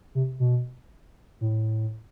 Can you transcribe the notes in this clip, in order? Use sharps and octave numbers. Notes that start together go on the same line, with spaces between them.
C3
B2
A2